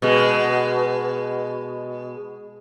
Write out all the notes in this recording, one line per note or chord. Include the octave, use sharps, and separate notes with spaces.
B2 G#3